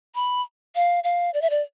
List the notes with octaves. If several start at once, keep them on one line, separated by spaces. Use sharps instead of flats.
B5
F5
F5
D5
E5
D5